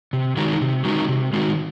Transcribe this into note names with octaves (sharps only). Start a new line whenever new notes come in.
C3
D#3 G#3 D#4 F#4
C3
D#3 G#3 D#4 F#4
C3
D#3 G#3 D#4 F#4